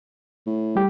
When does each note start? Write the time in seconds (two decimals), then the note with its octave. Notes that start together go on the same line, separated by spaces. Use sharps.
0.46 A2
0.75 G3 G4